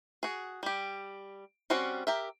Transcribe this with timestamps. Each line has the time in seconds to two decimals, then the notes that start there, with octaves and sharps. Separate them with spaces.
0.23 F#4 G#4
0.63 G3 G4
1.70 G3 C4 C#4 F#4 C5
2.07 G4 A#4 E5